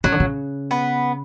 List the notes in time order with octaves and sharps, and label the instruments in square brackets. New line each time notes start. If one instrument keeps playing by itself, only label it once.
[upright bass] C#3 [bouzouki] F#3
[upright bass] D3
C#3
[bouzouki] B3